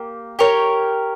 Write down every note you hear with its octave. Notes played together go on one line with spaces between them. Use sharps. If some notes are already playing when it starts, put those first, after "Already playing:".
Already playing: A#3 G4
G4 A#4 C#5